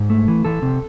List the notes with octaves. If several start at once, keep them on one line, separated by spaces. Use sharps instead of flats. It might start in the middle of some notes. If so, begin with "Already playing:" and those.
Already playing: G#2
A3
E3
E3 A4
C3